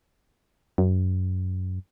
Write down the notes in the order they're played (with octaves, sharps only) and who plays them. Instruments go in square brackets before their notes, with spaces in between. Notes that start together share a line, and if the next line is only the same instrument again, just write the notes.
[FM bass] F#2